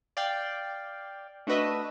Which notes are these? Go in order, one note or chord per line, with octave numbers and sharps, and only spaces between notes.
D5 F5 G5
A3 D4 F#4 B4 D#5 E5